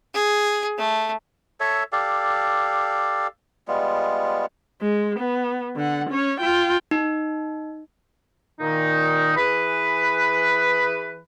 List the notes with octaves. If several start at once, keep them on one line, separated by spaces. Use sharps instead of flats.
G#4
A3
A4 C#5 E5
G4 A4 D5 F5
G3 G#3 B3 F4
G#3
B3
D3 F#5
C#4 C#5
F4 G5
D#4
A#2 D#3 D#4
E3 G#4 B4